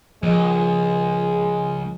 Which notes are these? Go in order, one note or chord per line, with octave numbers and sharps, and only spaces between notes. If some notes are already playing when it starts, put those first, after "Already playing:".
C#2 F3 G#3 A#3 D#5